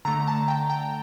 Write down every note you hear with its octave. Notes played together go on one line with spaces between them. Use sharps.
D3 A3 A#5
A5
G5
G5